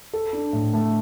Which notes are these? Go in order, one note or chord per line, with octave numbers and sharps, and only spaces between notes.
A4
D4
A2
A3